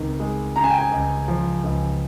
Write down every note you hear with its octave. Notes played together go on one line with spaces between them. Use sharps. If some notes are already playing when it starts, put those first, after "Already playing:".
Already playing: C#2 C3 D#3
G#3
C#3 A#5
G#5
G5
G#5
C#2
F3
C#2